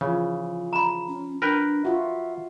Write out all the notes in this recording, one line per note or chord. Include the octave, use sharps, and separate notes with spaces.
C#3 E3 F3
A#5 B5
C#4
D4 A#4 B4 G5
F4 F#4 E5